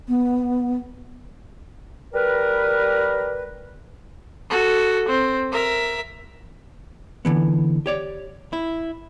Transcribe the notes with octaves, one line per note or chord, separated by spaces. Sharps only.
B3
G3 A#4 B4
F#4 A4
C4
A#4 E5
D3 E3 B3
G4 C#5 D5
E4